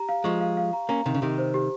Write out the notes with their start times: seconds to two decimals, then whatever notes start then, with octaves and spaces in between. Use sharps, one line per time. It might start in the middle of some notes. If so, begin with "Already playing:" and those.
Already playing: G4 A#5
0.09 F5
0.24 F3 G#3 C#6
0.41 F5
0.57 F5
0.73 A#5
0.89 A#3 C#4 A#5
1.05 C3 D#3 A#5
1.14 C#3
1.22 C3 D#3 G4
1.38 C5
1.54 G4